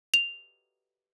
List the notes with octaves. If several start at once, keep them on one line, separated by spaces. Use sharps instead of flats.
F7